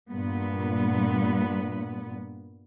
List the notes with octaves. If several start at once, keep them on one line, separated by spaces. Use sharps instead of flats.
G2 A#2 B3